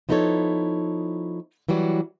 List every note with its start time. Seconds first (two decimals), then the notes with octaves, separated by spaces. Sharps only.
0.09 F3 B3 D#4 E4 A4 C#5
1.69 E3 F#3 G3 F#4